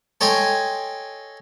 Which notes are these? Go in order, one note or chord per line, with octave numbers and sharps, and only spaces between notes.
A4 C#5 D#5 G5 G#5 C6